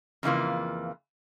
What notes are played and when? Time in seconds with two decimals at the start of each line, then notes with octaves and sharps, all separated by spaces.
0.23 F2 C#3 E3 A#3 F4